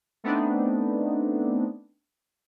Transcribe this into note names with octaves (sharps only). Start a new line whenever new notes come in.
A3 B3 C4 D4 D#4